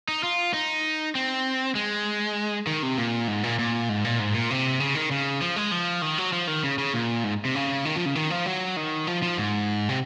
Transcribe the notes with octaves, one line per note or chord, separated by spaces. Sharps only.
D#4
F4
D#4
C4
G#3
D#3
C3
A#2
G#2
A#2
A#2
G#2
A#2
G#2
A#2
C3
C#3
D#3
C#3
F3
G#3
F3
D#3
F#3
F3
D#3
C#3
C#3
A#2
G#2
C3
C#3
D#3
F3
C#3
D#3
F3
F#3
D#3
F3
F3
G#2
C3